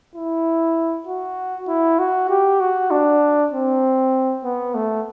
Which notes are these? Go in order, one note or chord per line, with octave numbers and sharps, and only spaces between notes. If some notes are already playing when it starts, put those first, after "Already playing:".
E4
F#4
E4
F#4
G4
F#4
D4
C4
B3
A3